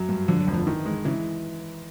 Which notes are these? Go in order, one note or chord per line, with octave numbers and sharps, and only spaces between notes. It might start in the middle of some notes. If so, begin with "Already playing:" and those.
Already playing: F#2 F#3
G2
D3 F3
F#3
F1
F3
D#3 E3
G#3
C#3 E3